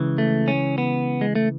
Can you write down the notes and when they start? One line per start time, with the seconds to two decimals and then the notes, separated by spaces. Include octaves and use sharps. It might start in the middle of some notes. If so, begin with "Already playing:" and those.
Already playing: C#2 C#3 E3
0.18 A3
0.48 C#4
0.78 B3
1.21 G#3
1.35 A3